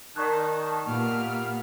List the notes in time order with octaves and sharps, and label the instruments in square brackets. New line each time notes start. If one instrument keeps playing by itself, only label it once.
[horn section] D#3 [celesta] D5 C#6 F#6 [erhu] A5
[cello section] A#2 [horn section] A#3 B3 G4 [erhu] F6